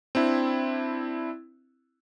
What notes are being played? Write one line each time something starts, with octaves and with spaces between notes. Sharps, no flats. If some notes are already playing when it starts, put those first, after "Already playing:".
C4 D4 E4